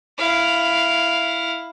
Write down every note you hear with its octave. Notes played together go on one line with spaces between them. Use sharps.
E4 F5